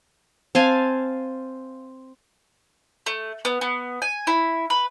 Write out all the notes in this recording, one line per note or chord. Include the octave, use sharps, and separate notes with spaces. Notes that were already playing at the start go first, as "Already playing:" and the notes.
C4 F5 G#5 A5
A3
B3
B3
G#5
E4
B4